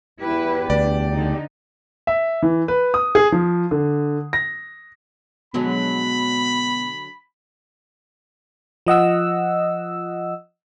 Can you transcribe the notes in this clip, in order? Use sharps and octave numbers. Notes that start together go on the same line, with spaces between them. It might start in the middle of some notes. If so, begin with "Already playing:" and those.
E2 E4 G4 B4
D2 D4 D5
D3 D#4
E5
E3
B4
D#6
G#4
F3
D3
A#6
B2 D3 F#3 G#3 B5
F3 D#5 F#5 E6